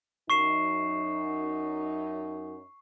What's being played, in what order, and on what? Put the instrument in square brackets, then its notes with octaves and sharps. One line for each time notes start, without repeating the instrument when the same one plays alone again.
[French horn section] F#2 D#4 [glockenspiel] C#6 C7 E7